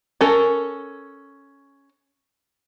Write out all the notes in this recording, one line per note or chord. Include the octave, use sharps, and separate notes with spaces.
C#4 A4 A#4